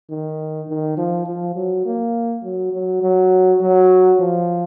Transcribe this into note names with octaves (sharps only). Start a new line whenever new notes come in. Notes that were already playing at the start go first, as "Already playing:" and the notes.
D#3
D#3
F3
F3
F#3
A#3
F#3
F#3
F#3
F#3
F3